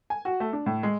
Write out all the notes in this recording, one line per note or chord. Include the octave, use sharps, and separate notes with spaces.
G#5
F#4
A3
D4
A2
G#3